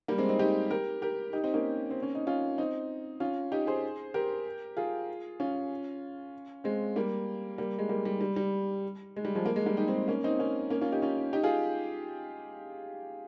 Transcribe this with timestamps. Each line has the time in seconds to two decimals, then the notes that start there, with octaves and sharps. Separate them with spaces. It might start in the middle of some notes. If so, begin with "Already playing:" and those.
0.08 G3 A#3
0.18 G#3 C4
0.29 C4 D#4
0.39 D#4 G4
0.71 G4 A#4
1.02 G4 A#4
1.33 D#4 G4
1.43 C4 D#4
1.54 A#3 C#4
1.91 C4
2.03 C#4
2.15 D#4
2.27 C#4 F4
2.58 C4 D#4
3.20 C#4 F4
3.52 D#4 G4
3.67 G#4 C5
4.14 G4 A#4
4.77 F4 G#4
5.40 C#4 F4
6.64 G#3 C4
6.96 G3 A#3
7.58 G3 A#3
7.79 G#3
7.89 G3 A#3
8.05 G3
8.21 G3
8.36 G3
9.16 G#3
9.25 G3
9.35 F3 G#3
9.46 A#3
9.56 G#3
9.66 G3 A#3
9.77 D#4 G4
9.88 G#3 C4
10.08 A#3 C#4
10.24 C4 D#4
10.39 A#3 C#4
10.70 A#3 C#4
10.81 C#4 F4
10.92 D#4 G4
11.02 C#4 F4
11.33 D#4 G4
11.43 F4 G#4